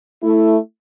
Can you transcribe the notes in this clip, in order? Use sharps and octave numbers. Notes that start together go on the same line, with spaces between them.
A3 E4